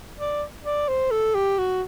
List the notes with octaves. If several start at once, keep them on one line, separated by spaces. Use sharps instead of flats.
D5
D5
C5
A4
G4
F#4